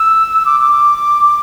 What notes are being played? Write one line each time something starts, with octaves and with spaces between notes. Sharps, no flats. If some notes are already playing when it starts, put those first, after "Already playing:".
Already playing: E6
D6
D6